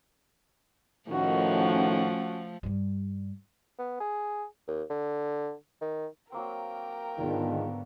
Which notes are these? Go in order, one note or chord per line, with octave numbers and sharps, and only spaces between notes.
A2 D#3 F3 A3 C#4 F#4
G2 G3
B3
G#4
D#2
D3
D#3
F#3 A#3 C4 A#4 G5
G#2 D3 D#3 G#3 B3 F4